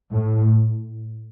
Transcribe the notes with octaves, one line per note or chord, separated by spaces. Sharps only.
A2